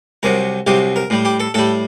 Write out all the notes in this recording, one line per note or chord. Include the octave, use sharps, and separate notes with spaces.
C2 C3 F#3 A#4
C2 C3 F#3 G4
A#4
A2 G3
G4
A4
A2 G3 A4